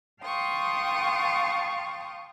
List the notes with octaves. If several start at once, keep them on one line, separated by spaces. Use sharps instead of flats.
F5 G5 A5 C6 C#6 D#6